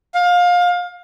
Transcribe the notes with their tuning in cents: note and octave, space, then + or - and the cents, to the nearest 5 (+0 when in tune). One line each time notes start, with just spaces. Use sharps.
F5 +25